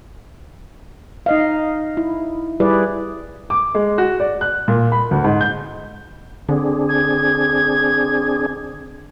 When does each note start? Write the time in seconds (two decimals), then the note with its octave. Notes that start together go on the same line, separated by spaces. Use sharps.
1.26 D#4 D#5 F5
1.97 E4
2.60 G3 E4 G#4 B4 D5
3.50 D6
3.75 G#3
3.98 F#4
4.20 D5
4.41 F#6
4.68 A#2
4.92 B5
5.11 D2
5.24 G#2
5.41 G6
6.49 D3 C4 D4 G#4
6.89 G#6